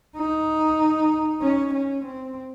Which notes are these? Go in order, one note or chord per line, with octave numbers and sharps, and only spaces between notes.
D#4
C#4
C#4
C4